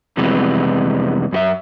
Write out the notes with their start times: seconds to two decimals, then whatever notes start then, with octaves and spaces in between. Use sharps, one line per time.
0.17 F2 C3 E3 G3 G#3 B3
1.32 F#2 F#4 E5